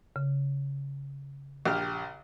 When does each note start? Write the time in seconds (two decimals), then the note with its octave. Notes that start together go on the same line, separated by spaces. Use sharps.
0.16 C#3
1.66 A#1 G4 F6